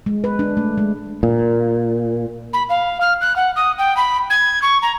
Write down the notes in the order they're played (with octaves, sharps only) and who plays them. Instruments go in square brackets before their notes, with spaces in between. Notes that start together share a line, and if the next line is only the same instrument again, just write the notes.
[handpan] G#3
B4
D4
A3
G#3
[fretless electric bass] A#2
[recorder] B5
F5
F6
F#6
F#5
D#6
G5
B5
G#6
C#6
A#5